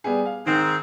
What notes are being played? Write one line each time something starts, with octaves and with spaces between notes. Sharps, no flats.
G3 B3 G#4
F5
G#2 D#3 C4